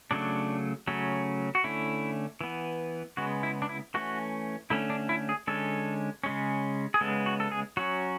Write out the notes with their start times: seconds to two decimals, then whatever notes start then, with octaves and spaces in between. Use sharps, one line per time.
0.11 C#3 F#3 A3 D4
0.87 C#3 F#3 A3 C#4
1.55 F#4
1.64 D3 A3 C#4 E4
2.41 E3 B3
3.17 C#3 G#3 B3 F#4
3.43 E4
3.62 D4
3.69 E4
3.94 E3 A3 C#4 F#4
4.70 D3 A3 C#4 E4
4.90 D4
5.09 E4
5.29 G#4
5.47 D3 G#3 C#4 A4
6.24 C#3 G#3 C#4
6.94 G#4
7.01 C#3 G#3 B3 A4
7.26 F#4
7.40 A4
7.51 G#4
7.77 F#3 C#4 F#4